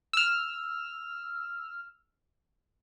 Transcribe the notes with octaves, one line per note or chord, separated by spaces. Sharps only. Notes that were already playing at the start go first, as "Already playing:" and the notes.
E6 F6